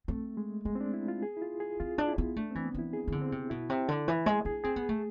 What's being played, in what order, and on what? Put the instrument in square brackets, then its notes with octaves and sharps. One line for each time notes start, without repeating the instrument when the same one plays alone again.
[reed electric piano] A3 [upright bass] C4
[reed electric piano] G#3
[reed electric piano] G#3 [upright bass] B3
[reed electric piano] C4
D4
E4
F4
G#4
E4
F4
G#4
[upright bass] C4 [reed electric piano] F4
[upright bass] D4
[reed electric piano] E4
[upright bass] B3
[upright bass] A3 [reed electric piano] D4
[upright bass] E3 [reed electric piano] C4
[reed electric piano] B3
[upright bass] E3 [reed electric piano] E4
[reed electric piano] G#4
[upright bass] E3
D3
[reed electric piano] C4
[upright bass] C3
[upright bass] B2 [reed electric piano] E4
[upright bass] C3
D3
E3
[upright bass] G#3 [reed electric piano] G#4
[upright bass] D4 [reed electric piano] G#4
[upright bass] C4 [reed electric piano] G#4
[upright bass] B3
A3